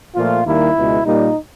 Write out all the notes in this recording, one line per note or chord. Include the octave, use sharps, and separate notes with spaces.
A#2 F3 A3 F4
D#2 D#3 G3 A#3 E4
C#2 B2 G#3
A#2 G3 A#3 D#4